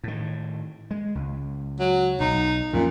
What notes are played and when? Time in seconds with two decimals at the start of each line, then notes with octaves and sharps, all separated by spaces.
0.04 A2 D#3
0.91 G#3
1.15 C#2
1.80 F#3
2.20 B1 D#4
2.73 A1 F2 A#2 C#4